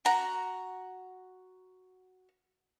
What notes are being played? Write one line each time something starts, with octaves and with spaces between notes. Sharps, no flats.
F#4 A#5